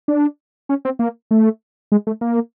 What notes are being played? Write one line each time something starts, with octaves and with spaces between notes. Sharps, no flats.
D4
C#4
C4
A#3
A3
G#3
A3
A#3